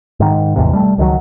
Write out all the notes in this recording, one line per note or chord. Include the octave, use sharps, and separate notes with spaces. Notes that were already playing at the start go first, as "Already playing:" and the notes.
G#2 D#3
G#1 E2 A2 C3
G3 A3
C#2 D#3 F3 F#3